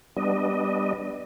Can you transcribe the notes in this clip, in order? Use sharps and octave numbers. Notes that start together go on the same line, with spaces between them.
G3 B3 D4 D#5